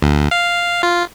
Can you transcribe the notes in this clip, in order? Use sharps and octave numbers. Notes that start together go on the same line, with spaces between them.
D2
F5
F4